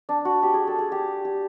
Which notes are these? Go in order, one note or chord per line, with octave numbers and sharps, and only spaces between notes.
D4
F#4
G4
G#4
A4
G#4
G4
G4